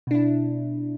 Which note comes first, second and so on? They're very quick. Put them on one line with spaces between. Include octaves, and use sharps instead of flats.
B2 D4 E4